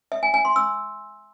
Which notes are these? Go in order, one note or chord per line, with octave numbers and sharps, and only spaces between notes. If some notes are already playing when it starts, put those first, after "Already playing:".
E5
G#5
G#5
C6
E6